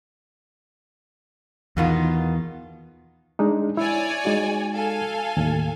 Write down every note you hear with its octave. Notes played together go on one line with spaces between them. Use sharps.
E2 B2 D#3 F4
G#3 D4 D#4
E4 C#5 D5 G#5
G#3 D#4 F#4
A4 F5 G#5
D#2 A2